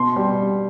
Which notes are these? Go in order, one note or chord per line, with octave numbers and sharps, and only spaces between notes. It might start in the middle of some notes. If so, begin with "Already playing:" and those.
Already playing: B2 C6
G3